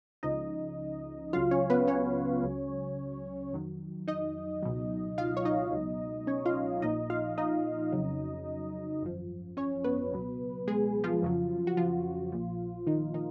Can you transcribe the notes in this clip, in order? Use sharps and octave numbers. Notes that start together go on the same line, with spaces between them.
C#2 C#3 F3 D#4 D#5
C#2 C#3 F#3 F4 F5
C#4 C#5
B3 B4
C#4 C#5
C#2 C#3 F#3
F2 D#3 F#3
D#4 D#5
C#2 B2 F#3
F4 F5
C#5
D#4 D#5
C#2 B2 F#3
C#4 C#5
F4 F5
A#1 A#2 F3 D#4 D#5
F4 F5
D#4 D#5
F2 C#3 F#3
G#1 F#2 F3
C#4 C#5
B3 B4
C#2 B2 F#3
G#3 G#4
F3 F4
F2 C#3 F#3
F#4
F3 F4
A#1 A#2 F3
D#3 D#4
D#3 D#4